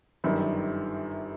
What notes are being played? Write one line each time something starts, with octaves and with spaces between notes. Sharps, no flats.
G1 F#2 D#3 G3